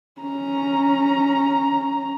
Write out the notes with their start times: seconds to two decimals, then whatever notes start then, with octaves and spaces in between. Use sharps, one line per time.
0.21 C#4 A#5